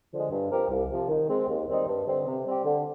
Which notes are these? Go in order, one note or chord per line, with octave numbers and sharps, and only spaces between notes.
D3 F3 G#3
G2
F3 C4 G4 A#4
C2
C3 F3
D#3
G#3 C4
D#2
D#3 G3 C4 D#4
G2
D3 G3 C4
C3
G3 C4 G4
D3